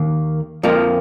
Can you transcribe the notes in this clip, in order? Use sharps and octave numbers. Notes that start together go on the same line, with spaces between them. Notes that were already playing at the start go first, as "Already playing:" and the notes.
Already playing: D#2 D#3 A#3
F2 F3 A#3